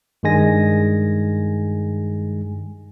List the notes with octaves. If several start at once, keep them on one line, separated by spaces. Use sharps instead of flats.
G2 D#3 G3 G#3 G#5 A#6